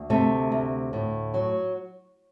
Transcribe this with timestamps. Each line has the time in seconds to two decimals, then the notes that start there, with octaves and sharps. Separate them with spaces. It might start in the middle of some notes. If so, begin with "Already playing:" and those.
Already playing: D2
0.10 C3 A3
0.52 D2
0.93 A2
1.34 F#3